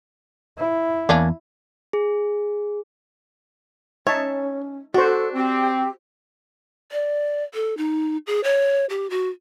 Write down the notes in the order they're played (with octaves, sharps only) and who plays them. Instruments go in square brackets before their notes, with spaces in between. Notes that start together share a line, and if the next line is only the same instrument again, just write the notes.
[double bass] E4
[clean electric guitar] E2 [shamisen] A#3 C#4 D4
[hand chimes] G#4
[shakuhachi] C#4 [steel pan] D#4 E5 A5 [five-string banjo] C#5
[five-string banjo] D4 [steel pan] F#4 C5 [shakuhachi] A4
[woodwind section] C4 [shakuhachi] G4
[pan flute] D5
A4
D#4
G#4
C#5
G4
F#4